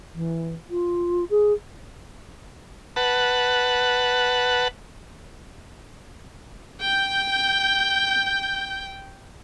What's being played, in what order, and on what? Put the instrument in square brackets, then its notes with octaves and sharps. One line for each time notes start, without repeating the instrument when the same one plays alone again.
[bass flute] E3
F4
G#4
[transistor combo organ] B4 F#5 A5
[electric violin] G5 G6